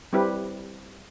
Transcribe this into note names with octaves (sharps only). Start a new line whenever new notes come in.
G3 C4 E4 G4 B4